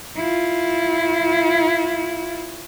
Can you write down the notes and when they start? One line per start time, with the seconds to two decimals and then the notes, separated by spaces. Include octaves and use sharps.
0.17 E4 F4